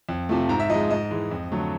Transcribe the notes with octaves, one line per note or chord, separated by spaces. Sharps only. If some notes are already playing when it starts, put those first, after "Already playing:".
F2
C3 F3 A3
G#2 A#5
E5
F3 G#3 D#5
G#2 D#5
E3 G#3
F2
D3 F#3 A3